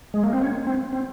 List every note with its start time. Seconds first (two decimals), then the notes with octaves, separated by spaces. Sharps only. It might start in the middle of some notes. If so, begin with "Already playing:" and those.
0.14 G#3
0.24 A#3
0.33 C4
0.42 C#4
0.67 C4
0.93 C4